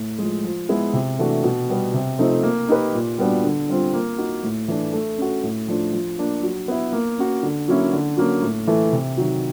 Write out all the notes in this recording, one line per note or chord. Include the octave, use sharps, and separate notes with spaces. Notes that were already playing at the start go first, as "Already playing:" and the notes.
Already playing: A2
F3 G#3
F3
G#3 B3 E4 G#4
C3
E3 A3 D4 F#4
B2
G3 B3
C3
F3 A3 C4 D#4
A#3
D#4 G4 B4
A#2
G3 B3 D4 F#4
D3
G3 C4 F4
A#3
D#4 F#4
A2
E3 A3 D4
A3
C#4 F#4
A2
F3 A3 D4
F3
A#3 D4
F#3
B3 E4
A#3
C#4 F#4
D3
F#3 A#3 C#4 E4
D3
F#3 A#3 C#4
A2
E3 A3
C3
D#3 F#3